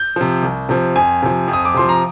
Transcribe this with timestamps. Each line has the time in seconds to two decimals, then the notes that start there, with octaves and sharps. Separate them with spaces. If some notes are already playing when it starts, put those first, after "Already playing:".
Already playing: G6
0.16 C3 F3
0.43 C2
0.69 C3 F3
0.95 F2 G#5
1.22 C3 F3
1.48 F2
1.53 D#6
1.65 D6
1.74 C3 F3 C6
1.89 A#5